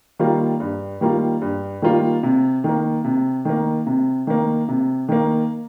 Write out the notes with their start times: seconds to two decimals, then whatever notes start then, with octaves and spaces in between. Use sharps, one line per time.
0.19 D#3 G3 A#3 F4
0.60 G2
1.01 D#3 G3 A#3 F4
1.42 G2
1.82 D#3 G3 A#3 F4
2.23 C3
2.64 D#3 A#3
3.05 C3
3.45 D#3 A#3
3.86 C3
4.27 D#3 A#3
4.69 C3
5.09 D#3 A#3